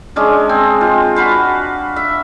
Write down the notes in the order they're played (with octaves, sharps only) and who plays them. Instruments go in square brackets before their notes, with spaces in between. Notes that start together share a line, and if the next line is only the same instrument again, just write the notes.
[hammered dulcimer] G#3 C#4 D4
C4
F4
F#4 B4 F5
E5